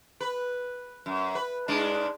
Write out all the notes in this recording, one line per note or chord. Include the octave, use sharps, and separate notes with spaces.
B4
F#2
B4
G#2 G#3 D4